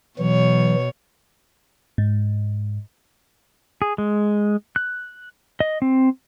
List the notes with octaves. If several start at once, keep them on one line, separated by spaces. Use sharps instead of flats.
B2 E3 F#3 C#5
G#2
G#4
G#3
F#6
D#5
C4